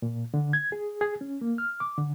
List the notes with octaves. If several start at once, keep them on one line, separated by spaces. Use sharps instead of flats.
A#2
D3
G#6
G#4
G#4
C#4
A#3
F6
D6
D3